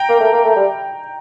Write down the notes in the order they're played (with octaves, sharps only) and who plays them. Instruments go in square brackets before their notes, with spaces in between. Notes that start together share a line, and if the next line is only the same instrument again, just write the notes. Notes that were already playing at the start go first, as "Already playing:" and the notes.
Already playing: [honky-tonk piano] G5 A#5
[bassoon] A#3
A3
A#3
A3
G3